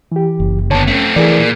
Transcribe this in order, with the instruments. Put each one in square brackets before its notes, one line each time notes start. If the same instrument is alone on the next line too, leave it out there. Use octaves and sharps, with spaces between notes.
[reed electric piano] E3 G4
[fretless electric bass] F#1
[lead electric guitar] D3 B3 [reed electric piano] C#5 A5
[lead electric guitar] A3 C4 [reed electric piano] C#4
[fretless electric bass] E3 [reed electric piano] G#4 A#4 D5
[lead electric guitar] A#2